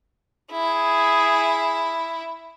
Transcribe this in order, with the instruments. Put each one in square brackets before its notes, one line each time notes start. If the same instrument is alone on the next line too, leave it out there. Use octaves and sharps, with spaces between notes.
[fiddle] E4 [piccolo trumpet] G#4